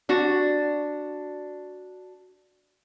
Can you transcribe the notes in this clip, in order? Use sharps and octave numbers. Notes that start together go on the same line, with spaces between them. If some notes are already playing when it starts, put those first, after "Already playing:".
D4 F#4